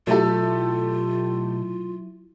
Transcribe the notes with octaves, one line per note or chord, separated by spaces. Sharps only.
B2 F#3 A3 E4 F4 G4 A4